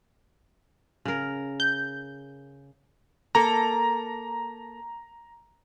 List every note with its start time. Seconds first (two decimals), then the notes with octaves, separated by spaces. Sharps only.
1.05 C#3 A#4
1.60 G6
3.35 A#3 A4 A#5